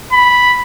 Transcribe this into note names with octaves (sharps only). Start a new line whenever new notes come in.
B5